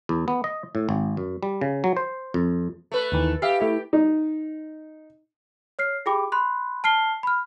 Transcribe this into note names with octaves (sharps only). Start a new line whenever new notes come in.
E2
B3
D#5
A2
G#1
F#2
G3
C#3
F#3
C5
F2
A3 B4
D#2 D#3 E3
G4 E5 F5 B5
A3 E4
D#4
C#5 F6 C7
F4 G4 G#4 G5 B5 D6
B5 C6 F#6
A5 F6 C7 G7
B5 F6